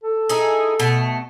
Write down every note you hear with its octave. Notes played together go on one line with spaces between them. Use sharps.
A4
D#4 E4 G#4
B2 A3